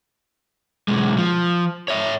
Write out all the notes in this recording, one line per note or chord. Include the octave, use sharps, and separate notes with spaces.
B1 G#3
F3
C#5 E5